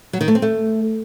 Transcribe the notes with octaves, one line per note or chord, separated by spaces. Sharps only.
F#3
D#3
A3
C4
A3